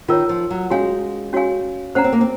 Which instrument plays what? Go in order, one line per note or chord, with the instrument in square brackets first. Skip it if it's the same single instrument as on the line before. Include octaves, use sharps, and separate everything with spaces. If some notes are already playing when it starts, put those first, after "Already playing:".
[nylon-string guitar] D#3 [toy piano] F4 A#4 C#5
[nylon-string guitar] F3
F#3
[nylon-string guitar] G#3 [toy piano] C#4 F#4 C#5 F5 G#5
[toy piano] C#4 F#4 C#5 F5 G#5
[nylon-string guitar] C#4 [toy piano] C5 F#5 A#5
[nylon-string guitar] C4
A#3
C4